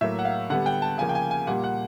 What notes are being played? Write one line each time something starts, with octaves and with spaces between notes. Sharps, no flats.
A2 F#3 A#3 E5
F#5
F5
D3 G3 B3 F#5
G5
A5
C#3 F3 A#3 G#5
G5
G#5
G#5
A#2 G3 A#3 F#5
F#5